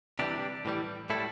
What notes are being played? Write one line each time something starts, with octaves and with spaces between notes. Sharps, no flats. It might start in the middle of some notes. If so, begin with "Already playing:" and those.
C3 E3 G3 D4 G4
A2 E3 G3
A2 G3 E4 A4